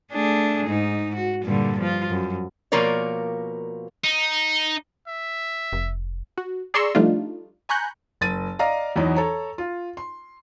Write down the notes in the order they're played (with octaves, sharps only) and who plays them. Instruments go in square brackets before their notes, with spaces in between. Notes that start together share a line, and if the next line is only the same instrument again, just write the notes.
[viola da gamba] A3 D4 G#4
G#2 D#4
F#4
G2 A#2 D3
F3 F4
F#2
[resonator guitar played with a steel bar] B2 F3 A#3 A#4 C#5 D5
[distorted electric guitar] D#4
[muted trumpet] E5
[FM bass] F1
[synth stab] F#4
G#4 D5 A#5 C6 C#6 E6
F3 G3 A3 D4 D#4 F4
G#5 A#5 B5 C#6 F#6 G6
[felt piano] F#1 A6 D#7
D5 D#5 F5 A#5
E2 E3 F#3 D#4
A4 C#5 A#5
F4
C6